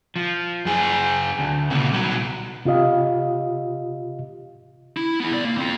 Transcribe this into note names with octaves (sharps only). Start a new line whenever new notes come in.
F3
F#2 G#4
D2
A#2 C#3
C2 F#3
C3 F4 G4 D#5 F5
E4
B3 E4
C2 D5
A#3
C4 F4